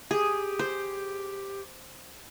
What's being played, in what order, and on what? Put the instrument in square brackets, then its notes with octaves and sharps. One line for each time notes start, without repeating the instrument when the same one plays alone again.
[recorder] G4 [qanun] G#4
[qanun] C5